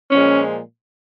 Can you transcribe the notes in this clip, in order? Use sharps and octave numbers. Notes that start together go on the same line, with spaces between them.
A#2 F3 G#3 C#4